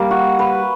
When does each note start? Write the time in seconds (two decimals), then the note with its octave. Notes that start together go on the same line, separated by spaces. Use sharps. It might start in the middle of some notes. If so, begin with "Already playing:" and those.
Already playing: G3 A#3
0.11 F#4
0.39 B4